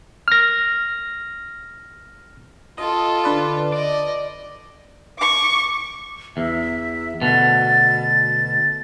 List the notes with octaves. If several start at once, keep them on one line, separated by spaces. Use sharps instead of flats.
F6 A#6
F4 A4 D#5
D3 B4 D5
D5 D#5 D6
C#6 D6
E2 E5
D2 B2 A6